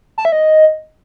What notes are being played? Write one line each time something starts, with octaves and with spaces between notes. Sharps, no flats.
A5
E5
D#5